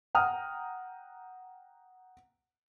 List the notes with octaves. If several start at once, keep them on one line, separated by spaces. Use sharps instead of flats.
F#5 G5 A#5 D#6 F6